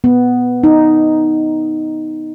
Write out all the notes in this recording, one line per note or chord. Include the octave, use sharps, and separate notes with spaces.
B3
D#4